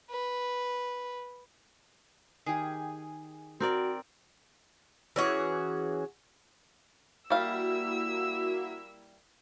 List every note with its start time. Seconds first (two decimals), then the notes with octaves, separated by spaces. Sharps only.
0.11 B4
2.46 D#3 G4 G#4
3.60 C4 F#4 A#4 D5
5.16 E3 C#4 F#4 G#4
7.30 G3 A#3 E4 F#4 E5 F5 E6